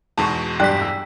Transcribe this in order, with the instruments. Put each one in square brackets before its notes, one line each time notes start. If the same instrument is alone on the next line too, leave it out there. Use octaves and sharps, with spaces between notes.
[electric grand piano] E2 G#2 B2 [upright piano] A5 C#6
[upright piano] G2 D4 F#6 [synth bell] G5 B6
[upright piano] E6